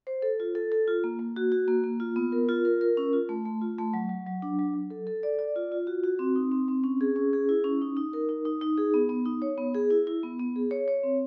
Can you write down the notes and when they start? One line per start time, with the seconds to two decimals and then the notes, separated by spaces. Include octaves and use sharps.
0.07 C5
0.22 A4
0.40 F4
0.55 A4
0.72 A4
0.88 F4
1.04 A#3
1.19 A#3
1.36 F#4
1.52 F#4
1.68 A#3
1.84 A#3
2.00 F4
2.16 B3
2.32 A#4
2.49 F4
2.65 A#4
2.81 A#4
2.97 C#4
3.13 F4
3.29 A3
3.45 A3
3.61 F4
3.78 A3
3.94 F#3
4.09 F#3
4.27 F#3
4.42 D4
4.59 F#3
4.74 F#3
4.90 A4
5.07 A4
5.23 D5
5.39 D5
5.56 F4
5.72 F4
5.87 F#4
6.04 F#4
6.19 C4
6.36 D#4
6.52 C4
6.68 C4
6.84 C#4
7.01 G#4
7.16 C#4
7.33 G#4
7.49 E4
7.64 C#4
7.81 D#4
7.97 D#4
8.13 A#4
8.29 D#4
8.45 D#4
8.61 D#4
8.78 G#4
8.94 B3
9.09 B3
9.25 D#4
9.42 C#5
9.58 B3
9.74 G#4
9.91 E4
10.07 E4
10.23 B3
10.40 B3
10.56 G#4
10.71 C#5
10.88 C#5
11.03 C4